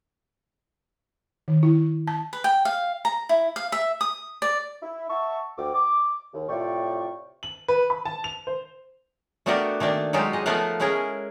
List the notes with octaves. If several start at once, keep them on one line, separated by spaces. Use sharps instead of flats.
D#3
E4
A5
B4
G5
F5
A#5
E4
F5
E5
D#6
D5
E4
E5 F#5 A5 C#6
D2 F#5 G5 D6
D6
D#2
A2 C3 F4 D5 G5 C#6
F#7
B4
B5
A5
F7
C5
A3 B3 D4 F#4 G4 A#4
D#3 A3 A#3 D4
F#3 G#3 D#4 F4 G4
G#3 D#5
F3 A3 B3 A#4 F5 F#5
G#3 C#4 E4 G#4 A#4